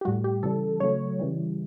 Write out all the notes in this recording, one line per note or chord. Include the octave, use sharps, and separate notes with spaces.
G4
A2 G3 F#4
G4
C#3 E3 G3 A4
C#3 F#3 A3 C#5
C#3 E3 G3